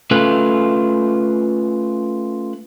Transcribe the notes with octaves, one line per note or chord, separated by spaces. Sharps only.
A3 C#4 F4 A4 B4